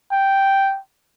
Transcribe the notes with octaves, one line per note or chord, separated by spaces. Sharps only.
G5